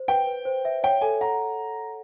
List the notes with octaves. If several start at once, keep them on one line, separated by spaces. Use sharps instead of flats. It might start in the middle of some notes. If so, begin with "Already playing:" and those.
Already playing: C5
B4 G5
B4
C5
E5
C#5 G5
A4 G#5
F#5 A#5